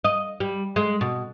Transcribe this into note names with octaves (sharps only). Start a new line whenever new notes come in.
D#5
G3
G#3
B2